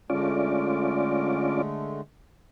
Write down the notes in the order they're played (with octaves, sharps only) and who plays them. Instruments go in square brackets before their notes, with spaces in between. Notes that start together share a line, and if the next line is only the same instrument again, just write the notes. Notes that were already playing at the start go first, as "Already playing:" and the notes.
[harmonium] D3 G#3 A3 [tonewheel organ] C#4 F4 D5